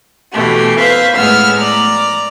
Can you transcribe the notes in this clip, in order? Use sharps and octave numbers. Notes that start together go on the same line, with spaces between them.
B2 E3 A3 G4
B4 C5 E5 F5
A2 G#3 B3 E6 F6
D5 A#5